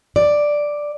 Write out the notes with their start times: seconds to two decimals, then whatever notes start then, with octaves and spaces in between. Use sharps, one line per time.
0.16 D5